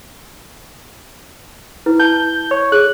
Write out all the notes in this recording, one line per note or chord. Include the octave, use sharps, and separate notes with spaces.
E4 B4
A5 G6
C#5
G#4 F#6